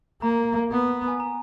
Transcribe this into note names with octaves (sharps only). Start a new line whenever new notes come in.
A#3 A#5
B3
G#5
A#5